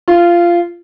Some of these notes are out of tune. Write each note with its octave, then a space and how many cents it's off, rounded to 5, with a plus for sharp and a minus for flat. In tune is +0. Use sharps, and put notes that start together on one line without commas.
F4 -15